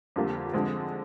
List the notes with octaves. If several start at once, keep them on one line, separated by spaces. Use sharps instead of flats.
F2 D3 G3 A#3
D3 F3 G#3 C4